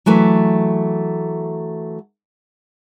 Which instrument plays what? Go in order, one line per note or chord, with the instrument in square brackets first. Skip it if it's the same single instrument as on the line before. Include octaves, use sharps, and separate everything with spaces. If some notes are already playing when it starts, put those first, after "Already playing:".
[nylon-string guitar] E3 F#3 A3 B4